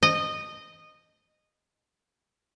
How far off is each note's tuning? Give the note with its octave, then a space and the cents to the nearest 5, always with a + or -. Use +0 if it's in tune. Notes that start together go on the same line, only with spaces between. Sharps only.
D#5 -15